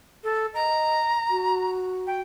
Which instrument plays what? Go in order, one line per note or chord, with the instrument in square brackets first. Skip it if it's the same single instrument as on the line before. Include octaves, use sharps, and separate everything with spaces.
[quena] A4
[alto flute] D#5 [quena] A#5
[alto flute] F#4
[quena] G5